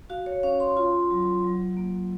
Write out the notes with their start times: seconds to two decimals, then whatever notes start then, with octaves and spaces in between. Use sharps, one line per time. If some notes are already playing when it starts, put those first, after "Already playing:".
0.10 F#4 F5
0.26 C#5
0.43 C#4 F5
0.60 C6
0.77 F4 C6
1.11 F#3
1.44 F#3
1.77 A#3